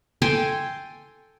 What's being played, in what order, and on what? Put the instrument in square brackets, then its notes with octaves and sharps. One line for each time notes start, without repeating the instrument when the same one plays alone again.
[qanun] A4 G5 G#5 C6